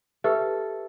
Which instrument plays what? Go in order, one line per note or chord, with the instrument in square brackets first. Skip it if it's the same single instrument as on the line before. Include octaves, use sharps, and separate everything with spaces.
[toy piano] G4 B4 E5 [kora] A4